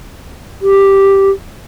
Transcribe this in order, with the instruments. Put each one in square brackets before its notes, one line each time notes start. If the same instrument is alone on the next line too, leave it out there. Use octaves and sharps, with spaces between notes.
[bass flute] G4